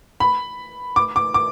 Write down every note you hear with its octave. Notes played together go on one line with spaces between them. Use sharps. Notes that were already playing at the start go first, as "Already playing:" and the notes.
B5
D6
D6
D6